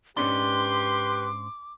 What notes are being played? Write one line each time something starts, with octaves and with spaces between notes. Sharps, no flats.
G#2 C#4 D4 G4 B4 C6 D6